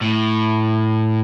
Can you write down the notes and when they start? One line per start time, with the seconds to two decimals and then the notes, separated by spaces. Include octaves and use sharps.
0.02 A2